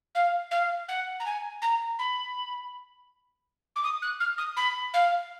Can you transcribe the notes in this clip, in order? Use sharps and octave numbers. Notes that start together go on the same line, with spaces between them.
F5
F5
F#5
A#5
G#5
A#5
B5
D6
D#6
F#6
F6
D#6
B5
F5